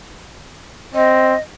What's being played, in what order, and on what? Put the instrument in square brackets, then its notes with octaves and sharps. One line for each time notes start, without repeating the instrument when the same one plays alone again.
[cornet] C4 [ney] D#5